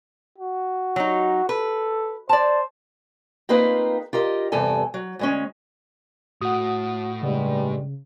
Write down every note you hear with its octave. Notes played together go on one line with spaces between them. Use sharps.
F#4
F#3 D#4
A4 B4
C5 D5 A5
A#3 C4 D#4 F4 G#4 B4
F4 G4 A#4 D#5
E2 G2 C3 A4 G#5
F#3
D2 G#3 C#4
A2 F#4 F#5 D#6
G2 C#3 G3 G#3